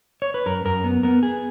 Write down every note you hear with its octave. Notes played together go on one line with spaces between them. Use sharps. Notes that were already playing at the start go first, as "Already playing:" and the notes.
C#5
B4
F#2 A#4
F#2 A#4
B3
B3 A#4
B3 G#4